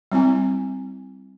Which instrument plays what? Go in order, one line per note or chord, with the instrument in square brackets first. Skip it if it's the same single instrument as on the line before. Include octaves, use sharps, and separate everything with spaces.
[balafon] G3 C4 E4 G#5